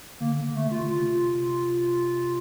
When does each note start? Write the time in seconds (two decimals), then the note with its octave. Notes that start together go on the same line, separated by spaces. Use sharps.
0.20 D3 A#3
0.44 D3
0.55 A3
0.67 C3 F4
0.81 D3
0.88 C3 F4